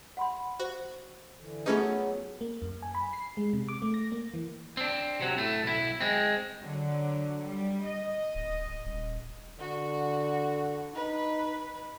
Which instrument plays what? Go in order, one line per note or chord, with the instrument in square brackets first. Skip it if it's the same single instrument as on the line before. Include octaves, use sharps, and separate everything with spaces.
[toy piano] F#5 B5 C6
[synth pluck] F#4 [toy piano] C5
[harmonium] D3 E3
[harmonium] F#3 B3 [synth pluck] A3 C#4 D#4 [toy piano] F4 G#4 B4
[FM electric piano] A#3
F#2
G#5
B5
C7
G#3
C3
D6
A3
A#6
A#3
E3
[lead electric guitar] C4 D4
C3 F#3
A2 A3
B1 E4
G#3 C4
[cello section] D3 F#3
G3
D#5
[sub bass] D1
D#1
[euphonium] D3 [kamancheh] F#4
[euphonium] D#4 [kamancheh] B4